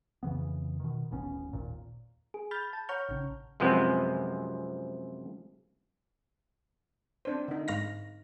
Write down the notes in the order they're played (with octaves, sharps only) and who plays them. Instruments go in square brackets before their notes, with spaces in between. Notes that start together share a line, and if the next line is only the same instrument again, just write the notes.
[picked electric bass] F2 C#3 E3 B3
B2 D#3
D#1 A1 B3 C#4
G#1 D#2 A#2
[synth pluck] G#4
B5 F6 G6 A6
A5
C#5 F#5 A#5 C#6 F6 G6
A1 C#3
[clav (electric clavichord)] F#2 C3 F3 G#3 B3 C4
[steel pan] C4 D4 C5
D3 D#4
[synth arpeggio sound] G#2 F5 A#6